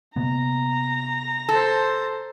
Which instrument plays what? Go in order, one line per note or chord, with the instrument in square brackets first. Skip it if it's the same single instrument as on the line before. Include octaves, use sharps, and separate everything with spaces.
[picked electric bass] C3 A#3 B3 [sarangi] A#5
[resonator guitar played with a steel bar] A4 [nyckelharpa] C5 A5